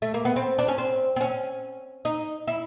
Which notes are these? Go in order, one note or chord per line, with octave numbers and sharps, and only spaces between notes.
A3
A#3
B3
C4
D4
C#4
C4
C4
C#4
D#4
E4